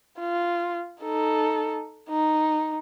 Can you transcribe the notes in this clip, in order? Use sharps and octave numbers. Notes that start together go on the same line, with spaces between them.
F4
D#4 A4
D#4